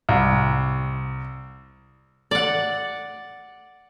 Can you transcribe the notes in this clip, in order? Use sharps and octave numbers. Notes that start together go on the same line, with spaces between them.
C2
D5 F#5